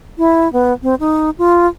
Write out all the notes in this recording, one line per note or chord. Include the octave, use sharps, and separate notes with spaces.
E4
B3
C4
D#4
F4